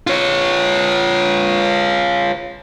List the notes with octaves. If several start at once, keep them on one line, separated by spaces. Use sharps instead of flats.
F4 C#5